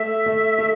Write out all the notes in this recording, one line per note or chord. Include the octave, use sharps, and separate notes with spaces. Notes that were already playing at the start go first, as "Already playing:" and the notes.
Already playing: A3 E5
A3
A3